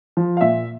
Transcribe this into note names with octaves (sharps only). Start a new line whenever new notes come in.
F3
F5
A#2 E5